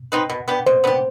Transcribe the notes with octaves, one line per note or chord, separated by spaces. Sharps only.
C4 D#4 B4
B2
B3 D4 G4
B2 C5
B3 D4 G4